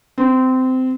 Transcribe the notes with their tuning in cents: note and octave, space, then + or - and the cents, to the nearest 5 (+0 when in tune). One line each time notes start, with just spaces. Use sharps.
C4 -20